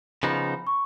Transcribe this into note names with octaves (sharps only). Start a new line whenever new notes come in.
C#3 F3 B3 D#4 B5
C#6